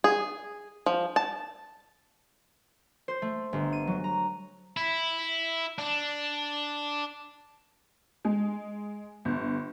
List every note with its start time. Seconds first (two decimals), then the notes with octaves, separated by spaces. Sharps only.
0.04 G#4
0.86 F3
1.16 A5
3.08 C5
3.22 A3
3.53 G1
3.73 D#7
3.87 F#3
4.04 A#5
4.77 E4
5.78 D4
8.25 G#3
9.25 G1